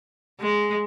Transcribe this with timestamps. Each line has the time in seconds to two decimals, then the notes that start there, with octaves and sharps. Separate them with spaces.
0.40 G#3